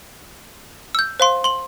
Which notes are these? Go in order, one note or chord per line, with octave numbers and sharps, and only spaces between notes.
E6 G6
C5 F5 C6
C6 F#7